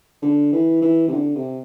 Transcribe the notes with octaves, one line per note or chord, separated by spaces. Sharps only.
D3
E3
E3
C3
D3
C3